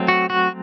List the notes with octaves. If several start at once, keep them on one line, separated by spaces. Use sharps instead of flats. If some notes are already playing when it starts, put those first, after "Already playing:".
Already playing: F#3 A3 C4
F#4
F#4